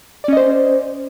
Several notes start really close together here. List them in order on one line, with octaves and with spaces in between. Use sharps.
D5 C#4 D#5 C5